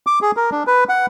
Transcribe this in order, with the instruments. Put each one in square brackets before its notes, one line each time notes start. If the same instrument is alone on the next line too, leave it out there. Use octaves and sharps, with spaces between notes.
[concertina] D6
G#4
A#4
D4
B4
F#5